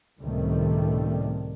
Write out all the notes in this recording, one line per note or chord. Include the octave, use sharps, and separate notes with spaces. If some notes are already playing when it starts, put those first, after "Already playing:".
C#2 A2 C3 D#3 G3 A3